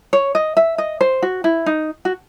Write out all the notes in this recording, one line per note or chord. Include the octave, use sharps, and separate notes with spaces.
C#5
D#5
E5
D#5
C5
F#4
E4
D#4
F#4